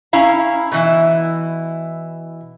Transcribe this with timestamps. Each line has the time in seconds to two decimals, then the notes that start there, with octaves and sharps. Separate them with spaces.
0.13 C#4 E4 F5 A#5
0.72 B2 E3 E4